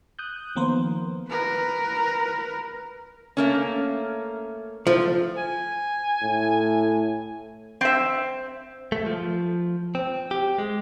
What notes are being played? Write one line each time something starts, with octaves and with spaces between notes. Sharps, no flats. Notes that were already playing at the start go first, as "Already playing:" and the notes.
D#6 F#6 G6
D#3 F3 A#3 B3 A#4 C5
A#4 B4
A3 A#3 C#4
F3 A3
G#5
A2
C4 E5
A3
F3
C4
G4
G#3